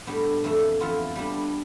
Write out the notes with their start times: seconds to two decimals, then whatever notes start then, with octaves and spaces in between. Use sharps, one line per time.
0.07 A2 G3 B3 D4
0.44 F2 E3 A3
0.80 F2 E3 B3 F4
1.15 G3 B3 D4